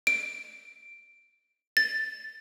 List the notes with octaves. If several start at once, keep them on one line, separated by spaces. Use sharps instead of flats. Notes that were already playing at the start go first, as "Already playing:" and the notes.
D7
A6